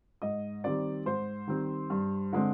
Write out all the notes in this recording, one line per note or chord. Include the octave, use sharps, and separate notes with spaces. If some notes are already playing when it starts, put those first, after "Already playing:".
G#2 D#5
D#3 G3 C4 D5
G#2 C5
D#3 G3 C4
G2
D3 G#3 C4